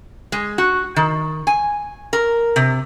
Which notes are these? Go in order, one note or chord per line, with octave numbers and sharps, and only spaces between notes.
G#3
F#4
D#3
G#5
A#4
C3